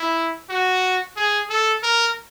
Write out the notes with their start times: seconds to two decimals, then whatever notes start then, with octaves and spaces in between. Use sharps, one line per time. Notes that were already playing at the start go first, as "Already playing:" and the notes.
Already playing: E4
0.49 F#4
1.16 G#4
1.49 A4
1.83 A#4